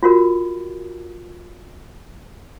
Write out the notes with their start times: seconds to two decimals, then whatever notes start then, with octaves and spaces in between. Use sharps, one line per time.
0.03 F4 F#4 A#4